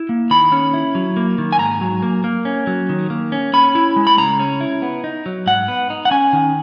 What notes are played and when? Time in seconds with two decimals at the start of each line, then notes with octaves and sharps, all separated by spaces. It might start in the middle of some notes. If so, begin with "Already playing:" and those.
Already playing: E4
0.09 A#3
0.30 D#3 B5
0.52 C#4
0.74 E4
0.95 F#3
1.17 A#3
1.38 D#3
1.52 G#5
1.59 G#2 A#5
1.81 F#3
2.03 A#3
2.24 A#3
2.45 C#4
2.67 F#3
2.89 D#3
3.10 A#3
3.32 C#4
3.53 C#4 B5
3.75 E4
3.96 G#3
4.07 B5
4.18 C#3 A#5
4.40 C#4
4.61 E4
4.82 B3
5.04 D#4
5.26 F#3
5.46 G#2 F#5
5.68 B3
5.90 D#4
6.05 F#5
6.11 C#4 G#5
6.33 D#3